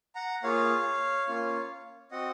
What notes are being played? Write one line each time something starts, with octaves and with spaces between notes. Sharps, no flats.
F#5 A#5
A#3 F4 G#4 C#5 F5
A#3 C#4 F4
C4 F#4 D#5 F#5